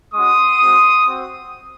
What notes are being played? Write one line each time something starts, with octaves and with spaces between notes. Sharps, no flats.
G#3 C#4 F#4 C6 D#6
G#3 C4 F#4
C4 F#4